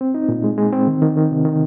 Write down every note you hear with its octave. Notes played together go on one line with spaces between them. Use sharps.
C4
D#4
A#2
G#3
G#3
C4
D#3
D#3
D#3
C3
D#3